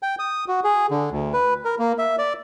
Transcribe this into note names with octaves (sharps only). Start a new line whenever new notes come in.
G5
D#6
F#4
G#4
D3
D2
B4
A#4
A#3
E5
D5